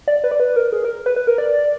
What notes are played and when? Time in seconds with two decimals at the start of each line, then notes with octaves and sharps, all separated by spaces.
0.08 D5
0.24 B4
0.31 D5
0.40 B4
0.56 A#4
0.72 G#4
0.84 A#4
1.06 B4
1.16 B4
1.27 A#4
1.38 D5